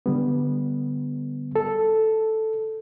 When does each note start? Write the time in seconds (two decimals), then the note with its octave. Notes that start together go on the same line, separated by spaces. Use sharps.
0.06 D3 G3 B3
1.56 A4